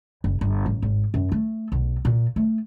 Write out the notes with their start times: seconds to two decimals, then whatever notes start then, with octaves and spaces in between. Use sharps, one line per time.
0.24 F#1
0.41 G1
0.66 A1
0.82 G#1
1.14 F#2
1.32 A3
1.72 B1
2.05 A#2
2.36 A3